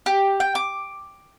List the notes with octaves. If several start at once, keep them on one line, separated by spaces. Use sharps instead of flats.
G4
G5
D6